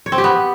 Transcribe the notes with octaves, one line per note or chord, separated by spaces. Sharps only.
C#5
C4
G4
B3